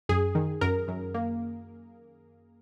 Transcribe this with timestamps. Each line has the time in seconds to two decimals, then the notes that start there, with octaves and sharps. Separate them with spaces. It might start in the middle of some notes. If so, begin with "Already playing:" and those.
0.09 F#2 G#4
0.35 D#3
0.61 F#2 A#4
0.88 F#2
1.14 A#3